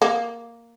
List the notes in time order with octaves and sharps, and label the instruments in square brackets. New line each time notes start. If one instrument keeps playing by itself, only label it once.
[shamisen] A#3